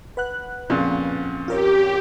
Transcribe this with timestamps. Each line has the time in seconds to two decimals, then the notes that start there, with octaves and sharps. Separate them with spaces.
0.17 B4 F#5 F#6
0.70 F2 A#2 C#3
1.48 F4 G4 A#4 C#5